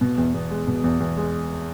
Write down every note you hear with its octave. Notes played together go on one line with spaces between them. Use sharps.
B2
E2
E2
G#3
B2
E2
E2
G#3